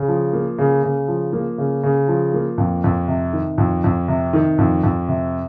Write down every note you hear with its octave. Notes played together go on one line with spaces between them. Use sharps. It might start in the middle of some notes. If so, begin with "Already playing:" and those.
Already playing: C#3
F3
A#3
C#3
C#3
F3
A#3
C#3
C#3
F3
A#3
F2
F2
C3
D#3
F2
F2
C3
D#3
F2
F2
C3